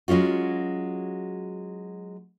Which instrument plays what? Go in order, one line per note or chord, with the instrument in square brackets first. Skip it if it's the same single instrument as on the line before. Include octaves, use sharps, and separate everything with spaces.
[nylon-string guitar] F#3 G#3 C#4 F4 F#4